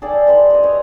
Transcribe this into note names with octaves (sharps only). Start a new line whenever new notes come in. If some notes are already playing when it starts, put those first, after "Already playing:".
G#4 A4 D5 G5
G4 B4 C5
G4 D#5
B4 C#5 E5